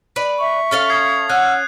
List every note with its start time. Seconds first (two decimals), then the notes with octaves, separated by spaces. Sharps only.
0.16 B4 D5
0.39 E5 C#6
0.71 C#4 A4 F5
0.90 D#6 G#6 C7
1.30 C#4 F#5 E6 F#6